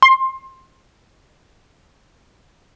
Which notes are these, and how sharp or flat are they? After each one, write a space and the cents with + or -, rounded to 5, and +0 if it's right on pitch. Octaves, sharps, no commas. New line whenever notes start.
C6 +20